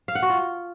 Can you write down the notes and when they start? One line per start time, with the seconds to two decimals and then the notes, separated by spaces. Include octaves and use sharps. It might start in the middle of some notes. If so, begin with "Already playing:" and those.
0.08 F5
0.15 F#5
0.22 F#4
0.30 F4